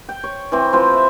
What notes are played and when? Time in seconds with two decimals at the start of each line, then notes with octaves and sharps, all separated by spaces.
0.09 G5
0.24 C#5
0.52 E3 C4
0.73 F3 C4 B4 C5
0.94 E5